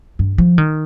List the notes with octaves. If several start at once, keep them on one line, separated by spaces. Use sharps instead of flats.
G2
F3
D#3